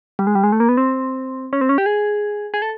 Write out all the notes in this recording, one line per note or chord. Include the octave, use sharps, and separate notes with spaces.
G3
G#3
G3
G#3
A3
A#3
B3
C4
C#4
C4
C#4
G4
G#4
G#4
A4